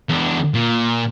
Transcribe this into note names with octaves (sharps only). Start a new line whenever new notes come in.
E2 D4
A#2